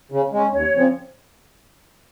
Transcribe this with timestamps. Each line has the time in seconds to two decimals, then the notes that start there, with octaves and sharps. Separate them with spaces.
0.12 C#3
0.32 G#3 C#4
0.53 D#2 C#5
0.74 C#3 F3 C4